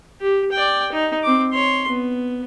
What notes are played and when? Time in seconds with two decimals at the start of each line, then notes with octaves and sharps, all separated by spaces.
0.21 G4
0.52 D5 G5
0.92 D#4
1.23 C4 D6
1.52 C#5 C6
1.89 B3